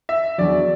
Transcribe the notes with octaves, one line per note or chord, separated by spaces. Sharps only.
E5
E2 D3 F#3 D5